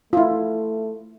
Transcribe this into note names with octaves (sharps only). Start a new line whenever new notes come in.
A3 E4 F4